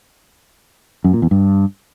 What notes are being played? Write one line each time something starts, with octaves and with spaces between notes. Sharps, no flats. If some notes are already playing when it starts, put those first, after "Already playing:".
F#2
A#2
E2
G2